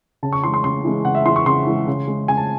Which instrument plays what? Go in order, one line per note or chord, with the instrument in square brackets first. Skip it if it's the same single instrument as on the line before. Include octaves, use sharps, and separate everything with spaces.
[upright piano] C#3 A5
C#6
E3 G#3 C6
C6
C#3 C6
E3 G#3
C#3 F#5
E5
E3 G#3 C6
C#6
C#3 C6
E3 G#3
C#3
G#3
C#3 G#5
A5